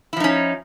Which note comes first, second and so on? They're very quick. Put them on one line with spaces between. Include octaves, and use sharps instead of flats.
E4 F3 D#4 C#4